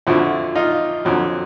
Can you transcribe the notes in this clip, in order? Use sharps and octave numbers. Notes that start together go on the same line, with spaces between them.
F2 D3 F3 E4 F#4
D#4 F4
F2 D3 F#3